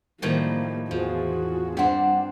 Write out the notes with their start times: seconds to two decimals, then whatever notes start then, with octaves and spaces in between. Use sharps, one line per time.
0.22 A2 D#3 F3 G3 A#3
0.91 E2 F3 F4 F#4 G#4
1.77 G2 G3 C4 D4 F#5